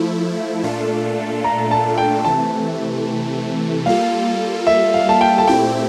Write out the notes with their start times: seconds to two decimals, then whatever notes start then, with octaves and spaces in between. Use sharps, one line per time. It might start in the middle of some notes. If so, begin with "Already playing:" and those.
Already playing: F3 A3 E4
0.63 A#2 A3 D4 F4 A4
1.44 A#5
1.71 A5
1.98 G5
2.25 C3 E3 A3 A5
3.86 G3 A#3 F4 A4 F5
4.67 E5
4.94 F5
5.09 A5
5.21 G5
5.38 A5
5.47 A#2 A3 C4 E4 G4 G5